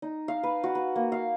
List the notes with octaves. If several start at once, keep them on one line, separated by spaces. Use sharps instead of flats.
D#4
F5
B4
F#4
B4
A#3
F5